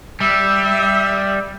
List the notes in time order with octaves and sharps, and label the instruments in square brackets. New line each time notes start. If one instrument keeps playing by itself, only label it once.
[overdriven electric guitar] G3 [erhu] E5